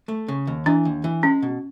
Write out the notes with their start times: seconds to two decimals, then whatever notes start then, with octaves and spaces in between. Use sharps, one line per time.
0.08 A3
0.28 C#3
0.47 D#2
0.66 E3 D4
0.85 D#2
1.04 E3
1.23 G#3 C#4
1.42 B2